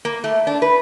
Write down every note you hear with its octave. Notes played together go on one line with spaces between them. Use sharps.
A#3
A3
D4
B4